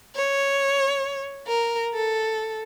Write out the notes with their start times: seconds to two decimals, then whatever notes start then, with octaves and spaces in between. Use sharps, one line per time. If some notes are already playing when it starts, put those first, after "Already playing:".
0.15 C#5
1.47 A#4
1.94 A4